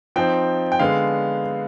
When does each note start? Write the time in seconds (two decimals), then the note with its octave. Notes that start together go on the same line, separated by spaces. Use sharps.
0.16 F3 C4 D#4 G5
0.72 G5
0.79 D3 G#3 B3 D4 F5